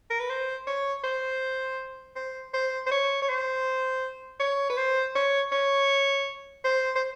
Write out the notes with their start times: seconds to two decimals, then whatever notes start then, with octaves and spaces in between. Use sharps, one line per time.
0.10 A#4
0.20 B4
0.30 C5
0.67 C#5
1.04 C5
2.16 C5
2.54 C5
2.86 C5
2.92 C#5
3.22 C#5
3.29 C5
4.40 C#5
4.70 B4
4.77 C5
5.15 C#5
5.52 C#5
6.64 C5
6.96 C5